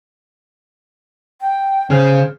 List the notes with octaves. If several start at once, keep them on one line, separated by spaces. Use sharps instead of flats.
G5
C#3 C#4 G#4 C5 F6